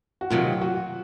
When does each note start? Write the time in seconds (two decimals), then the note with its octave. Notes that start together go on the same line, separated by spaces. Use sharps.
0.21 F#4
0.30 F2 C3 D#3 F#3 F4
0.61 F#4